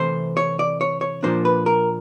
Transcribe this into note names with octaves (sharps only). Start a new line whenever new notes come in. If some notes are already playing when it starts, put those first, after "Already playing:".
Already playing: C3 E3 A3 C5
C#5
D5
C#5
C#5
A#2 F3 A#3 D4 C5
B4
A#4